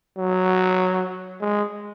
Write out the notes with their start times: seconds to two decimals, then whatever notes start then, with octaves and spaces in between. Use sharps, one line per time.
0.17 F#3
1.41 G#3